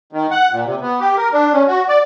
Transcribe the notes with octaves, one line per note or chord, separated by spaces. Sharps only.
D#3
F#5
A#2
C3
B3
G4
A#4
D4
C#4
F#4
D5